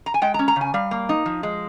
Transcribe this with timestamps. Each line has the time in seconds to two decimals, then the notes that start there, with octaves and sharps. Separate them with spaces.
0.06 A#5
0.14 G#5
0.22 G#3 G5
0.34 A#5
0.39 C#4
0.48 A#5
0.56 C#3
0.61 G#5
0.74 G3 F5
0.91 A#3
1.09 D#4
1.26 F3
1.43 G#3